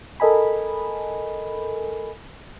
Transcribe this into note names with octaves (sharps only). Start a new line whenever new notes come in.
A4 A#4 D#5 G#5 B5